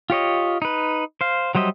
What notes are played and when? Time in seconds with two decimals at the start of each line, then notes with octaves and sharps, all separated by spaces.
0.10 F4 G4 C#5 D#5
0.62 D#4 B4
1.21 C5 F5
1.55 F#3 G3 C5 D#5 E5